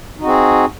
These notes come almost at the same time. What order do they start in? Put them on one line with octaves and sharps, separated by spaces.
D#4 F#4 C4 G#4